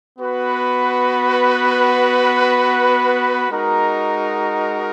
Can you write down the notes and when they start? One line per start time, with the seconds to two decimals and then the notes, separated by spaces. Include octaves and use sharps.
0.19 B3 F#4 B4
3.49 G#3 D#4 F#4 A#4